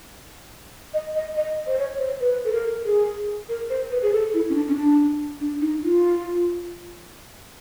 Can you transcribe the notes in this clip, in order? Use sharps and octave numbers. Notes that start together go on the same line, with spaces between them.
D#5
D#5
D#5
C5
C#5
C5
B4
A4
A#4
G#4
A#4
C5
B4
G#4
A4
E4
C#4
D4
C#4
D4
D4
D#4
F4